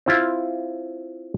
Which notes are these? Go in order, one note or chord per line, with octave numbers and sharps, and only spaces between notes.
C4 E4 F4